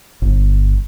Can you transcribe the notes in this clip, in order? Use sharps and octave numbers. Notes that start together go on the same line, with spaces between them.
G1